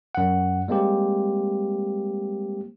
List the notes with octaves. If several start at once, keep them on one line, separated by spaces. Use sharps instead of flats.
F#2 F#5
G3 G#3 A#3 C4 G4